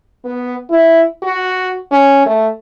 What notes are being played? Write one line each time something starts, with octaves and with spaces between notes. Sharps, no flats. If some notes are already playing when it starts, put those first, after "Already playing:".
B3
E4
F#4
C#4
A3